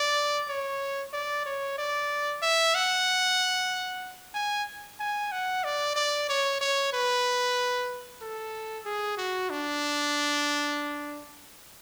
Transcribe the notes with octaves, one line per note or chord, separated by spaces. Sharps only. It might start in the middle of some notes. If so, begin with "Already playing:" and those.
Already playing: D5
C#5
D5
C#5
D5
E5
F#5
G#5
G#5
F#5
D5
D5
C#5
C#5
B4
A4
G#4
F#4
D4